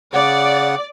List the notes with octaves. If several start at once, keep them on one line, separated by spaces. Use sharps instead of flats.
C#3 D5 F#5